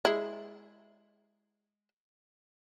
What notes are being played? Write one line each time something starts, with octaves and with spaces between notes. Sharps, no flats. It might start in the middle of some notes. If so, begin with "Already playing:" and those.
G#3 E4